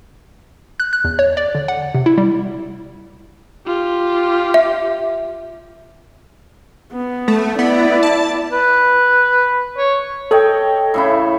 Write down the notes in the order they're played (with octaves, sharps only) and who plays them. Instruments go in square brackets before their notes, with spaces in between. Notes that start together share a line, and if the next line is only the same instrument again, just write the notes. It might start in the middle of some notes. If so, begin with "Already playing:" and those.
[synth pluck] F#6
F#6
E2
C#5
D5
D3
F#5
C3
E4
G3
[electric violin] F4 G4
[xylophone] E5
[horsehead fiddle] B3
[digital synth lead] A3
[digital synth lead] B3 [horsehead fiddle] E4 D5
[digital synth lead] A5
[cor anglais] B4
C#5
[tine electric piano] A4 [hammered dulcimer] C#5 D#5 G5
[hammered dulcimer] A2 C#3 E4